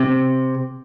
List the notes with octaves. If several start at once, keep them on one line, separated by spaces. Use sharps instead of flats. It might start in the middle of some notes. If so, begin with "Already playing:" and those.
Already playing: C3